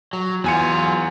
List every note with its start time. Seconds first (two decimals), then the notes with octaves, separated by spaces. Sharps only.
0.13 F#3
0.44 E2 F#3 F4 G#5 C#7